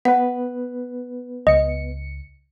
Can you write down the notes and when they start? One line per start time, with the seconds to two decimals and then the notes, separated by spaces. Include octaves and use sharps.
0.05 B3 B4 F#5
1.47 C#2 D#5 C#7